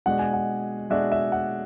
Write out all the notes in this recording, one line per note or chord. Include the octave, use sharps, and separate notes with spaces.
B2 G#3 D4 F#4 F#5
G#5
F#5
B2 G#3 D4 F#4 E5
E5
F#5